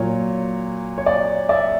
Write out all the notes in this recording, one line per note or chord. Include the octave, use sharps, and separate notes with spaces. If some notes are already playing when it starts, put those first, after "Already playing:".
Already playing: A#2 F#3 C#5
C#5
D5
D5 E5